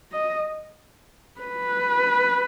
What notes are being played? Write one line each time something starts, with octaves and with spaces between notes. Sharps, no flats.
D#5
B4